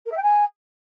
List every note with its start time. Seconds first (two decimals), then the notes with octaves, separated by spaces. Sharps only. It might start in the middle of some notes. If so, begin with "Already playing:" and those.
0.06 A#4
0.11 E5
0.17 G5
0.22 G#5